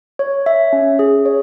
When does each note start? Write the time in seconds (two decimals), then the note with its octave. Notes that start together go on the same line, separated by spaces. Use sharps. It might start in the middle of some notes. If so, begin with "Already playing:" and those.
0.19 C#5
0.46 E5
0.73 C#4
0.99 G#4
1.25 C#5